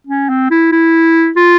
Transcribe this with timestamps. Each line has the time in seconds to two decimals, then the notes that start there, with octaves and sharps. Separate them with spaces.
0.07 C#4
0.29 C4
0.51 E4
0.72 E4
1.36 F4